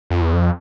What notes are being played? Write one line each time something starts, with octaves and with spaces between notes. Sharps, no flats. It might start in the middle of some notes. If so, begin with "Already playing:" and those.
F2
E2
F2